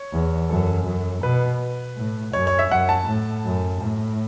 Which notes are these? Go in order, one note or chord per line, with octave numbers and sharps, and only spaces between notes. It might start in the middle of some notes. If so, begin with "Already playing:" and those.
Already playing: C#5
E2
F#2 A4
F#2
B2 B4
A2
F#2 C#5
C#5
E5
F#2 F#5
A5
A2
F#2
A2